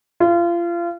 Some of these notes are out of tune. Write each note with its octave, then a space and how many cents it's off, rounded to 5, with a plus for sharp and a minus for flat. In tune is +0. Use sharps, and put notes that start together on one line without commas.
F4 -30